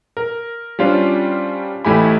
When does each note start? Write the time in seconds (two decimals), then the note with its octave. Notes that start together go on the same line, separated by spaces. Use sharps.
0.17 A#4
0.79 G3 C#4 D4 F4 C5
1.85 A1 A3 E4 G4 G#5 B5